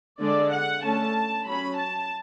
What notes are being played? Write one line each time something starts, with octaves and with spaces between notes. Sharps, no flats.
D3 G#3 D4 D5
F#5
D3 A3 C#4 A5
F#3 C#4 B5
A5